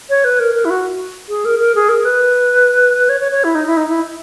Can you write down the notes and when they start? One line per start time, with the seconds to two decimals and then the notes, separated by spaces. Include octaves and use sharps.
0.10 C#5
0.24 B4
0.40 A#4
0.55 A#4
0.65 E4
0.70 F#4
1.29 G#4
1.45 A#4
1.59 A#4
1.75 G#4
1.89 A#4
2.05 B4
3.09 C#5
3.20 C#5
3.32 C#5
3.44 E4
3.55 D#4
3.67 E4
3.77 D#4
3.89 E4